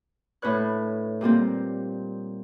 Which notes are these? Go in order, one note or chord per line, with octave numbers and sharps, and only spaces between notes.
A2 D4 B4 C#5 F#6
A#2 G3 A#3 C4